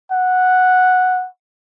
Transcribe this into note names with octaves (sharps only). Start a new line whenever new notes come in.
F#5